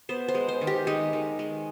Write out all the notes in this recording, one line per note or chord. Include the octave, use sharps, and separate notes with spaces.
B3 C5
C5
G#3
C5
D#3
G4
G#3 D#4
D#3
G#3